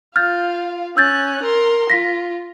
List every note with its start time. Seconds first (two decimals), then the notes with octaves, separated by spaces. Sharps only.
0.16 F4 F5 F6 G6 A6
0.97 C#4 E6 F#6 G6 A6
1.43 A#4 C6
1.90 F4 A#6 B6